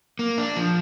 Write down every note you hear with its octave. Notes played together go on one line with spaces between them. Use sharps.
A#3
D4
F3